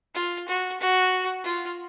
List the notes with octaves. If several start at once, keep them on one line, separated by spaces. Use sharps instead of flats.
F4
F#4
F#4
F4